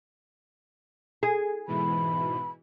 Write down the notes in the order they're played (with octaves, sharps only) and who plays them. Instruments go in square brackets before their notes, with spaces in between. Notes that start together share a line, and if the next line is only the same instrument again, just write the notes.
[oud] G#4
[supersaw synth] G#2 B2 E3 [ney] B5